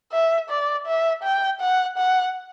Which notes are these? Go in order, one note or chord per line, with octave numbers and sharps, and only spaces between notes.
E5
D5
E5
G5
F#5
F#5